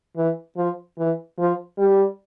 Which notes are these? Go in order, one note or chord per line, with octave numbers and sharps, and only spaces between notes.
E3
F3
E3
F3
G3